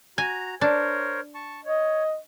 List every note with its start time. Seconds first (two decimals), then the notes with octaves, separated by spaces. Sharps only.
0.18 F#4 G#5 A#5
0.61 D4 A#4 C5 C#5
1.35 A5 C#6
1.65 C#5 D#5